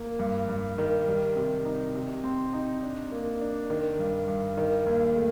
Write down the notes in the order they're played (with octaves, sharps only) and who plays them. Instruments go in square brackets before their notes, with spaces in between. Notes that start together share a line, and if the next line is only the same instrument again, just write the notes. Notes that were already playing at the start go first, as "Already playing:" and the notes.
Already playing: [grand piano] A#3
G2
G2
D#3
G3
C3
D#4
C3
C4
D#4
D4
A#3
D4
D#3
G2
G2
D#3
D#2
A3